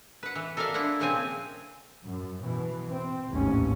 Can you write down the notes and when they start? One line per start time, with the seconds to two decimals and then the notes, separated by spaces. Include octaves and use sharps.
0.23 B4 F#5
0.35 E3
0.57 A4 A#4 D5 E5 F5
0.74 D4 E4 F4 F#5
1.00 A#2 C#3 F3 C4 G#5
2.04 F#2
2.40 B2 E3
2.89 C4
3.30 A1 D#2 G#2 C#4